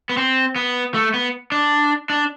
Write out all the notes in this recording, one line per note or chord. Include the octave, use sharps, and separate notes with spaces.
B3
C4
B3
A3
B3
D4
D4